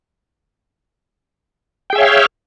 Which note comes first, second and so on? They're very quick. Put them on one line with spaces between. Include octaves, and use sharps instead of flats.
G5 G#4 E5 C#5 F5